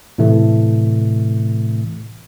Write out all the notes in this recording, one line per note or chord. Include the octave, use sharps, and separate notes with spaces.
A2 C3 E3 A3